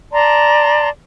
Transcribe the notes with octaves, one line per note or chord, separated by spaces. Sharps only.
D5 A5 A#5 C6